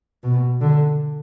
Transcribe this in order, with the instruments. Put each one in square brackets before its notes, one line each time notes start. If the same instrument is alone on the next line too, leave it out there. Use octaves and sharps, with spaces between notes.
[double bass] B2
D3